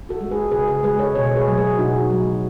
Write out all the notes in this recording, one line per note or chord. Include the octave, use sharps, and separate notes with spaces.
F#4 A4
G#3
G#4 B4
C#3 G#4 B4
G#4 B4
G#3 G#4 B4
A4 C#5
B2 A4 C#5
G#4 B4
F#3 A3
G#4 B4
B2 D#4 F#4
F#3 A3